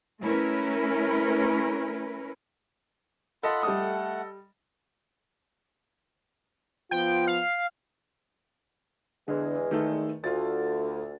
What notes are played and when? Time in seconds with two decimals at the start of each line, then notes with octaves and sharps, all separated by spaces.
0.22 A3 C#4 E4 A#4 B4
3.43 F4 A4 D#5 F#5 B5
3.63 G3 A3 F#5 D#6
6.91 F3 B3 F4 G5
7.27 F5
9.28 E2 D3 G#3
9.71 D#3 A3 A4
10.24 D2 F4 A6